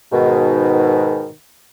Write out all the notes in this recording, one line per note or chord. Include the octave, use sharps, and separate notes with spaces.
G#2 B2 D#3